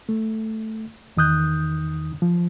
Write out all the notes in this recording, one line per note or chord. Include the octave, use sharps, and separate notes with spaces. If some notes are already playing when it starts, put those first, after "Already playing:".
A3
E2 D#3 D#4 D#6 F#6 G6
F3